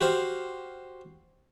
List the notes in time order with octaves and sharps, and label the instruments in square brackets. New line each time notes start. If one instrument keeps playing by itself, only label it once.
[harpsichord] F#4 G4 C5 F5